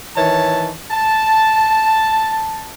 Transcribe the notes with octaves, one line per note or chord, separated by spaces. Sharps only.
D#3 E3 C#5 A5
A5